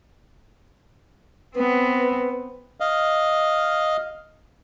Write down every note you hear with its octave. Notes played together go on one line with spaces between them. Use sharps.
B3 C4 B4
D#5 F5